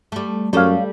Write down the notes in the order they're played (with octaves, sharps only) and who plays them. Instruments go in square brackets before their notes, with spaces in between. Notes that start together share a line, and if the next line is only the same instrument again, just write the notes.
[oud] G3 A3
[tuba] F#2 [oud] G3 D4 A4 [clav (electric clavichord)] C#5 F5